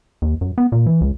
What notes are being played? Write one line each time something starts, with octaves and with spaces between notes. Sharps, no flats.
D#2
F#2
B3
A#2
E3
C#2